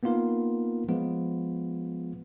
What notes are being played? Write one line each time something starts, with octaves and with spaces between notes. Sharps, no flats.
A#3 B3 D#4 F4 A#4
F3 G#3 B3 F4